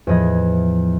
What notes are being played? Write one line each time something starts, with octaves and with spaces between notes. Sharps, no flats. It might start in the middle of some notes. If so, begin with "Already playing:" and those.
E2 A2 F3 D#5 B5 G#6